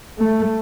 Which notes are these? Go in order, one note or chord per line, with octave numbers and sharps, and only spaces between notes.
A3